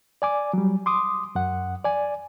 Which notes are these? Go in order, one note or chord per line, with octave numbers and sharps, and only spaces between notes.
D5 G#5 D6
F#3 G3
C6 D6 D#6
F#2 F#5
D5 G#5